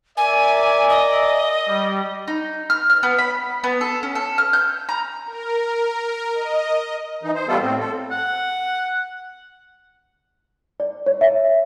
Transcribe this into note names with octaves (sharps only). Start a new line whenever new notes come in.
A#4 D5 E5 G#5
D#5
G3
D#4
F6
F6
B3
B5
B3
A4
C#4
A4
F6
G6
A#5
A#4
D#5
E3 D#4
C5
G3 A3 B3 F4 A4
A2 C4
A4
F#5
D5
C#5
E5